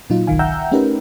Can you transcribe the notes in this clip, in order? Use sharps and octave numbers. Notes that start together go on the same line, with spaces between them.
A#2 F#3 D#4 F4
G1 C2 D#3 F5 G#5
E5 F#5 G5 A#5 E6 G6
A3 C#4 D#4 G4 A#4 B4